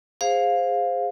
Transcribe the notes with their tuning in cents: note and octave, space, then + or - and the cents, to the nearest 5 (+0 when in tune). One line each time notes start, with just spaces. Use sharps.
G#4 -15 C5 +0 F5 +10